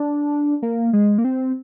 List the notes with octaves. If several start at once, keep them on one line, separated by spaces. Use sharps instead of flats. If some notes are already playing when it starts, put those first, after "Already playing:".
Already playing: D4
A#3
G#3
A#3
C4